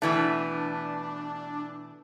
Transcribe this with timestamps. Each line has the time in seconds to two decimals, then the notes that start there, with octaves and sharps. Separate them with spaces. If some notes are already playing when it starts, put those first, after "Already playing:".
0.02 B2 E3 A3 D4